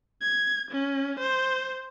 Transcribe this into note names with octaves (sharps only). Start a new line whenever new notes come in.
G#6
C#4
C5